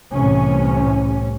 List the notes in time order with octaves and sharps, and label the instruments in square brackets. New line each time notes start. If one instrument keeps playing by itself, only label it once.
[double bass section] C2 A2 C3 E3 C#4